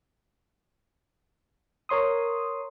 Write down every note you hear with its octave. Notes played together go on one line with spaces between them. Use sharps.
A#4 C#5 C6 D#6